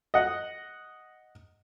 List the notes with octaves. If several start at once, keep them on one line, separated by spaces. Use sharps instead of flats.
D#5 F#5